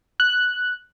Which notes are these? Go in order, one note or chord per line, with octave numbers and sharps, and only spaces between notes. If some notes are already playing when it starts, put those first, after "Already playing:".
F#6